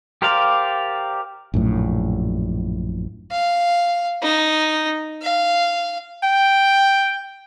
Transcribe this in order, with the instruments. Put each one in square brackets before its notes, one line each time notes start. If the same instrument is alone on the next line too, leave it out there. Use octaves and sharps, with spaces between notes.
[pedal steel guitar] G4 A#4 C5 D5 F5
[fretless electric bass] A#1 F#2 A2
[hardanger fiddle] F5
D#4
F5
[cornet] G5